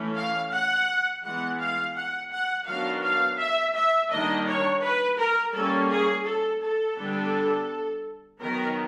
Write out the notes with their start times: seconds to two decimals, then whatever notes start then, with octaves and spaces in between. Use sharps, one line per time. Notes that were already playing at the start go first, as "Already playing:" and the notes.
Already playing: E3 A3 C#4
0.16 F5
0.52 F#5
1.23 E3 G#3 B3 F#5
1.59 F5
1.95 F#5
2.31 F#5
2.67 D#3 F#3 B3 D4 F5
3.02 F5
3.38 E5
3.75 E5
4.10 D#3 G3 A#3 D4 D#5
4.46 C#5
4.82 B4
5.18 A#4
5.54 G3 A#3 C#4 A4
5.90 G#4
6.25 A4
6.61 A4
6.97 D3 G3 B3 D4
8.40 D#3 F#3 B3 A#4